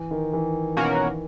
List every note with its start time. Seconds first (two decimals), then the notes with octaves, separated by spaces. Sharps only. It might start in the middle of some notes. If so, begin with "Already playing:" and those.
Already playing: E3
0.11 D#3
0.33 E3
0.77 B2 A#3 C#4 F#4 A#4